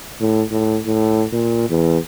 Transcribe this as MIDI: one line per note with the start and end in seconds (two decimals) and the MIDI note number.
0.20 0.42 45
0.51 0.78 45
0.85 1.25 45
1.33 1.65 46
1.69 1.98 40